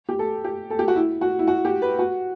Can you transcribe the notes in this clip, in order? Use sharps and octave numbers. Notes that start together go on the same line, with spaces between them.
G4
A4
G4
A4
G4
F#4
E4
F#4
E4
F#4
G4
B4
F#4